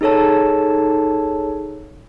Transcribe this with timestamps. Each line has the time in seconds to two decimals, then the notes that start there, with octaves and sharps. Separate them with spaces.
0.01 D#4 G#4 A4 C#5 A5